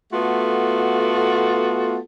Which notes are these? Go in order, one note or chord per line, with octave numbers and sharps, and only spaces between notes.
A3 B3 F4 F#4 A4